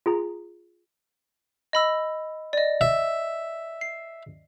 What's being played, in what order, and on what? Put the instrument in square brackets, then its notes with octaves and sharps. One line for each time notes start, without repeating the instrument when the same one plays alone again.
[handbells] F4 G#4 A#5
[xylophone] D#5 B5 E6
D5 D#5
[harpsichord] E5
[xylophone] C7